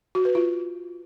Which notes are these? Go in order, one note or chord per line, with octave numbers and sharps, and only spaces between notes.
F#4
B4
F4